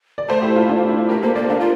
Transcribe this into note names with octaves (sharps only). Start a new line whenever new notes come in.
D5
A3 A4 C5
E4 G4
F4 A4
D4 F4
E4
A3 G4 A#4
A#3 A4 C5
A#3 A#4 D5
D4 D5 F5
F4